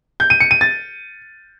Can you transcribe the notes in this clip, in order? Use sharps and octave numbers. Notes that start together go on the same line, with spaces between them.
G6
D#7
C#7
D#7
A6